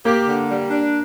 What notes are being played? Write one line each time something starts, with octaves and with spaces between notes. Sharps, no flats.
A#3 G4
D3
G3
D4